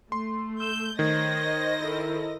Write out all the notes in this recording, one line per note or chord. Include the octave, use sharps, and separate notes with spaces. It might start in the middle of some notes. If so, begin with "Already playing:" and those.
A3 C6
E6 G6
D#3 C5 C#5 D#5 A#6
E4 A4 A#4